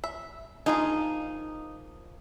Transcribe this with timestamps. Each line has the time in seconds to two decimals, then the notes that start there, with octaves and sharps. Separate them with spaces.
0.04 E5
0.66 F3 A#3 D#4 G#4